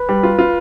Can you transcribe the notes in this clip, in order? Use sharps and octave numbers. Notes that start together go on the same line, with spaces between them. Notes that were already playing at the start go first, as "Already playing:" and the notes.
Already playing: B4
G3
F4
F4